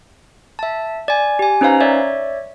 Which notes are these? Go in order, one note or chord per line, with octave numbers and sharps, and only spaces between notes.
E5 A5
D5 G#5
G4 G#5
C#4 D#4 B4 C5 F5 A#5
C#5 D5 E5